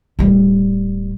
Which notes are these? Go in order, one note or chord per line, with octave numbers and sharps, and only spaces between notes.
D1 G3